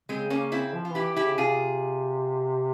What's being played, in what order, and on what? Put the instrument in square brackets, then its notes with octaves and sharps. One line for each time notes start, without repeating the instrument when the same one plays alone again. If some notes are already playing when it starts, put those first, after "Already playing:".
[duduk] C#3 [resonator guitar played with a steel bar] G#3 C4
[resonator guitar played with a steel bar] A#3 C#4
C4 E4
[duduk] F3
[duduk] E3 [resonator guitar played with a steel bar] F4
[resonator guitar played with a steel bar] E4 G4
E4 G4
[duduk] C#3
[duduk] C3 [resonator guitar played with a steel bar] F4 G#4